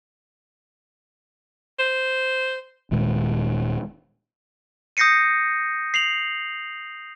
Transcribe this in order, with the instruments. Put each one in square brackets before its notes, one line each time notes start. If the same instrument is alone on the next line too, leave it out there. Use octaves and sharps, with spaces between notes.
[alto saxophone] C5
[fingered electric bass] D#1 A#2 D#3 G#3
[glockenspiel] D#6 G6 A#6 C7 C#7 D#7
C7 F7 F#7